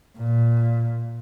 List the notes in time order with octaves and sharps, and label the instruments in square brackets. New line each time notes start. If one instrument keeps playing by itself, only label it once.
[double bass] A#2